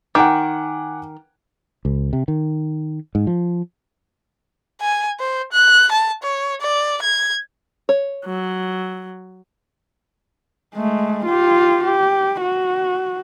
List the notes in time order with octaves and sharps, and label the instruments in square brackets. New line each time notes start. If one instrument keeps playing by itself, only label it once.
[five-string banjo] D#3 [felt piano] F#5 G#5 D6
[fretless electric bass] C#2
C3
D#3
G#2
F3
[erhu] G#5
C5
F#6
A5
C#5
D5
G#6
[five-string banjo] C#5
[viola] F#3
[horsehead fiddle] G#3 A3
F4 G4
G4
F#4